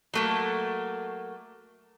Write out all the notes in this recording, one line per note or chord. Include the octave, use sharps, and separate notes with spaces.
F#3 A3 A#3